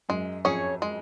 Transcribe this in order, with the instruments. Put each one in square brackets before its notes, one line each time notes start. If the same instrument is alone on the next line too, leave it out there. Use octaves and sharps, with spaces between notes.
[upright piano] F#2 [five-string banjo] G#3
[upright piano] F2 [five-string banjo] C#4 G#4 C#5
[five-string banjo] G#3